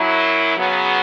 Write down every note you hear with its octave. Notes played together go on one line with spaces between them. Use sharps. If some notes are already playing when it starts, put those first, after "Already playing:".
Already playing: F#2 F#3 E4
C#3 F#3 B3